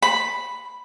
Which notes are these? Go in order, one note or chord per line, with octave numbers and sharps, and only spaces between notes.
B5